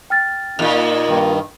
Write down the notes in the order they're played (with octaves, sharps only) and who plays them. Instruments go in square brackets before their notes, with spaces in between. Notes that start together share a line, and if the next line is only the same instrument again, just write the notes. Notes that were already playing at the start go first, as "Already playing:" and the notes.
[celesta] G5 F6 A6
[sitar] E2 A#2 [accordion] A#3 D#4 F4
[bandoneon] G2 D#3